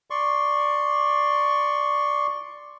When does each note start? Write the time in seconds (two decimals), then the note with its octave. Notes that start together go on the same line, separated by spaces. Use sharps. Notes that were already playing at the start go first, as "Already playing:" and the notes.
0.10 D5 C6 C#6